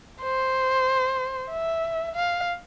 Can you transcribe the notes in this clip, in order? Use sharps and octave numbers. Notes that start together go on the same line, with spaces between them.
C5
E5
F5